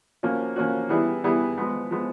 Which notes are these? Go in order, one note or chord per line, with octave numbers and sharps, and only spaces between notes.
F3 A#3 C#4 F#4
F3 A#3 C#4 F#4
E3 G3 B3 E4 G#4
E3 G3 B3 E4 G#4
F3 G#3 B3
F3 G#3 B3